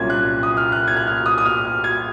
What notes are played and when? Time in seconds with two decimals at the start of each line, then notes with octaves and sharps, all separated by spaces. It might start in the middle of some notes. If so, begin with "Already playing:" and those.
Already playing: C2 A#2 F#3 A#3 C#4 G#6
0.10 F#6
0.43 D#6
0.57 F6
0.72 F#6
0.87 G#6
0.97 F#6
1.07 F6
1.26 D#6
1.38 D#6
1.46 F6
1.65 F6
1.84 G#6